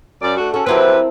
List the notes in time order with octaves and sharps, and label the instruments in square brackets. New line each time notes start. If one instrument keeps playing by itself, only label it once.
[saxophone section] F#2 C#4 D5
A3 D4 F#4
[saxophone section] C#4 F#4 [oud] A4
[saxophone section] F#3 G4 B4 [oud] C4 E4 A#4